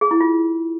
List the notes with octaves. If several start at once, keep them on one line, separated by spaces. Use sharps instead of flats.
G#4
E4
F4